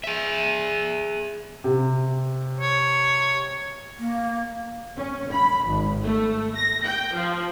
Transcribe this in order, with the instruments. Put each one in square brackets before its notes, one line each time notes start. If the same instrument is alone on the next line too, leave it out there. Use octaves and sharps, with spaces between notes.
[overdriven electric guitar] G#4 E5
[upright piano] C3
[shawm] C#5
[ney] A#3
[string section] C#4
B5
G#1
A3
A#6
G5
F3